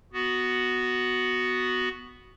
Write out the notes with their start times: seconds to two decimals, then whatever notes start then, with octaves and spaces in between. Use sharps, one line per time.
0.13 B3 F#4